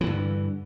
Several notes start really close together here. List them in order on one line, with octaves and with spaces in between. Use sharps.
E3 D3 G2